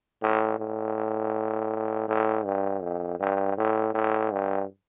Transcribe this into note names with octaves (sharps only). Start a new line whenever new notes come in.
A2
A2
A2
G2
F2
G2
A2
A2
G2